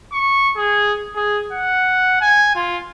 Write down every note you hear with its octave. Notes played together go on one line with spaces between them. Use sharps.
C#6
G#4
G#4
F#5
G#5
F4